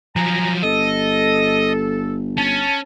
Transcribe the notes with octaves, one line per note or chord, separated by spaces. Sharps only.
F3 F#3 G#5 A#5
G1 A4 D#5
C#4 A5